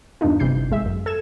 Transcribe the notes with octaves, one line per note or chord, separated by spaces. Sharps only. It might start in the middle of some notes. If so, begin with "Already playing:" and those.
E2 G2 D4 D#4 F4
G1 C3 E3 G6 C7
G#1 G#3 E5
F#2
A4 G#6 E7